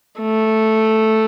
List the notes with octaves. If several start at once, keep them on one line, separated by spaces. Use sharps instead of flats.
A3